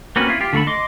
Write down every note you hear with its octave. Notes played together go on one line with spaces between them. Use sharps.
A#3 C4 C#4 F#4 B4
E4 F4
F4 G4
D3 A3 A4 B5
D#5 C6 D6